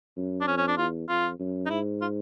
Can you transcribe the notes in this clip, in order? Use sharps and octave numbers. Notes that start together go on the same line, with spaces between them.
F#2
D4
F2 C#4
C#4
D4
E2 F4
F2 F4
F#2
D#4
G#2 E4
F4